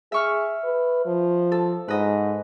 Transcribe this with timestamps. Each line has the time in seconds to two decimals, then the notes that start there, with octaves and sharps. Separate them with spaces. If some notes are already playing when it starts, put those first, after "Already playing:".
0.12 G#4 E5 C#6 F6
0.64 B4
1.06 F3
1.52 A4
1.88 G#2 B4 D#5